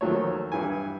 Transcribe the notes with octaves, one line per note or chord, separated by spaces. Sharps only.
D#2 D#3 F3 F#3 A3 C#5
G2 E3 G#5